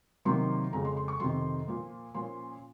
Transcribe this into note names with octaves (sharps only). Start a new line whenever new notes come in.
C3 D#3 F#3 A#3 D#4 C6
F2 C#3 G#3 A#5
C6
C6
C#6
F2 C3 D#3 C6
A#2 F3 A#3
A#2 F3 A#3 C#4 C6